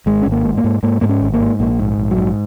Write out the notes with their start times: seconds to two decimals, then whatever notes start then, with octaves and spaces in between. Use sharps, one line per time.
0.06 G#1 G#3
0.22 G#1 C#4
0.32 A#3
0.45 G#2
0.57 A#3
0.64 G#2
0.83 G#2 A#3
1.01 G#2 A#3
1.09 C#4
1.21 G#1
1.34 A#3
1.41 G#2
1.59 A#1 A#3
1.79 G#2
1.98 A#1
2.11 F#3
2.18 G#2